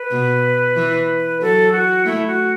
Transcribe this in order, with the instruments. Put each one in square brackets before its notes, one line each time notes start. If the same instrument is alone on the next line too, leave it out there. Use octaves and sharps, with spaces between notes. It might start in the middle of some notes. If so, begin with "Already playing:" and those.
Already playing: [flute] B4
[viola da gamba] B2
E3
[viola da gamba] F#3 [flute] A4
[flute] F#4
[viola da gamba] A3 [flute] E4
[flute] F#4